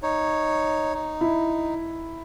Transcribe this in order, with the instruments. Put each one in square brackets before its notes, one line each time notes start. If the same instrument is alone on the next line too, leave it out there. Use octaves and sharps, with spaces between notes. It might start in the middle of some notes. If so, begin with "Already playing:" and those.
[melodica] D#4 C#5
D#4
[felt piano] E4